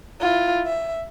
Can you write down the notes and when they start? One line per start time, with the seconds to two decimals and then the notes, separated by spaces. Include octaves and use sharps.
0.21 E4 F4
0.66 E5